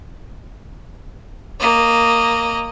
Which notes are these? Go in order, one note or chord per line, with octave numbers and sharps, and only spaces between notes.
A#3 D#5